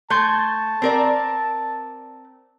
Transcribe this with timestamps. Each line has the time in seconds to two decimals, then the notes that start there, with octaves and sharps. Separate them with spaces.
0.10 A3 A5 C6 G6 G#6
0.82 C4 A#4 D5